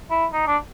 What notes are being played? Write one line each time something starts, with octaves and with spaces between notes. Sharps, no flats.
E4
D#4
D4